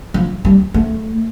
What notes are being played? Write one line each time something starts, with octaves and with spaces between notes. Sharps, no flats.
F3
G3
A3